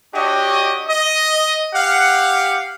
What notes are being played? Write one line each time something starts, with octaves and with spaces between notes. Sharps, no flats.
D4 F#4 G4 C#5 D#5
D#5
G4 F5 F#5